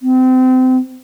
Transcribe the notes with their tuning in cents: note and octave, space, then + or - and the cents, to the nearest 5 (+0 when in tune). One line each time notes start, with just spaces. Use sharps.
C4 -30